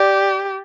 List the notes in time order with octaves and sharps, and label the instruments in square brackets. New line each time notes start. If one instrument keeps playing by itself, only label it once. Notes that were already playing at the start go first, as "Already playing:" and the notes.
Already playing: [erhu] G4 [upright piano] D5